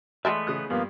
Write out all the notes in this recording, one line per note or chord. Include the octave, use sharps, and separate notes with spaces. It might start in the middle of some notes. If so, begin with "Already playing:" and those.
E3 G#3 A3 B3 D5 E5
C#3 D#6 F#6
G2 F3 A#3 B3